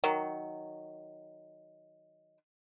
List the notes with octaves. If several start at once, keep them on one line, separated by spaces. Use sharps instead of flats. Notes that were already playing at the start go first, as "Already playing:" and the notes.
D#3 F#3